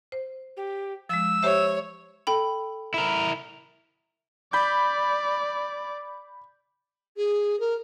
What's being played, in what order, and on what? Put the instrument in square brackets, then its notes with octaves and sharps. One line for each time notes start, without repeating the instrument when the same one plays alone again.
[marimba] C5
[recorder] G4
[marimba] F3 G#3 [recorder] E6
[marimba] G4 C5 E5 [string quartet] C#5
[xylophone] A4 G5 B5
[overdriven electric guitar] E4 A#4
[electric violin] D5 [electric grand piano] B5 G6
[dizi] G#4
A#4